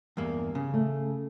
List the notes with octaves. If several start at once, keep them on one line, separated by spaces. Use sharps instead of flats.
E2 G2 A#3
C#3
A3